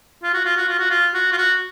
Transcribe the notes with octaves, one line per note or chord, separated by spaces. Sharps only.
F4
F#4
F4
F#4
F4
F#4
F4
F#4
F4
F#4